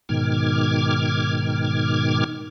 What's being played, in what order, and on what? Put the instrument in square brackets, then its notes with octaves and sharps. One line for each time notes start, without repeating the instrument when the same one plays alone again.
[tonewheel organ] G#2 B2 D#3 D6 F6 G#6